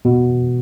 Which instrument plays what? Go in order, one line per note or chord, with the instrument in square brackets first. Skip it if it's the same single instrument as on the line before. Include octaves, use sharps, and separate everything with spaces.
[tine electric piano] B2